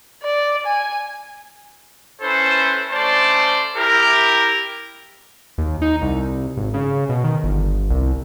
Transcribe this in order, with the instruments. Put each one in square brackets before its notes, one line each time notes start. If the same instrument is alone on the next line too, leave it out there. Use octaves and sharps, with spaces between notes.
[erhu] D5
G#5
[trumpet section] C#4 E4 A4 B4 C5
A3 C#4 C5 D5 A5 C6
E4 G4 A#4
[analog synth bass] D#2
D#4
C2
G#1
C#3
B2
D#3
G1
C2